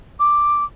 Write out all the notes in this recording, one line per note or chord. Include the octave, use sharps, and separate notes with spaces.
D6